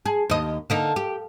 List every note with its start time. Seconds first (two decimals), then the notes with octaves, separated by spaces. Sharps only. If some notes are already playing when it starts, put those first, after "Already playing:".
0.06 G#4
0.30 D#2 D#5
0.70 D3 A#3 D#4
0.96 G4